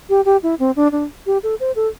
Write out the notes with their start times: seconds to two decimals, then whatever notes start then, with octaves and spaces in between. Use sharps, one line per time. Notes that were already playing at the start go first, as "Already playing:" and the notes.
0.09 G4
0.25 G4
0.43 E4
0.59 C4
0.76 D4
0.92 D4
1.26 G4
1.43 A4
1.60 C5
1.76 A4